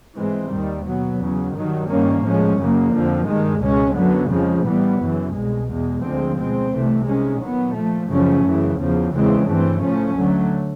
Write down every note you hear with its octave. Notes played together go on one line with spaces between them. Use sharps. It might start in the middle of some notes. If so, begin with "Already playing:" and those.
G#2 E3 G#3 C4
D#2 D#3 G3
B2 F#3 B3
E2 C#3 F#3
G2 D#3 F#3
G2 D#3 G3 A#3 C#4
A2 F3 G#3 C#4
F#2 C#3 F#3 A#3
F2 D3 F3
G2 D#3 G#3
C#2 B2 G#3 C#4
F#2 D3 F#3 B3
F2 C#3 F3 G#3
A2 E3 G3 B3
F#2 C#3 E3
C2 B2 G#3
E2 B2 G#3
D2 D3 F3 G#3 C4
B2 G#3 C4
C2 C3 E3 A3
C3 D#3 G#3 C#4
A#2 F#3 B3
A#2 F3 A3
F#2 C#3 F3 A3 C#4
F#2 C#3 E3
E2 C#3 F3
E2 C#3 E3 G#3 C4
G2 E3 A3 C4
A2 F3 A3 C#4
D2 D3 F#3 A3